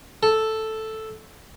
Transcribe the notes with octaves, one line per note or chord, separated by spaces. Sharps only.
A4